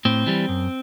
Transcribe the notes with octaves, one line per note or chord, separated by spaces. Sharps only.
A2 C4
E3 G3
F#2